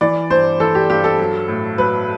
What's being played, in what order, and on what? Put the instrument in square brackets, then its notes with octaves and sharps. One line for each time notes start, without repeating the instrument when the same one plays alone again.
[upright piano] E3 D5
G2 C5
E3 A4
G4
G2 G4
A4
F#3
A2
F#3 B4